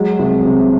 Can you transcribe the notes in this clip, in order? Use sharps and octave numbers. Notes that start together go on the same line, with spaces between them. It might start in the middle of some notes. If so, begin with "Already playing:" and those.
Already playing: F#3 G#3
C2
C3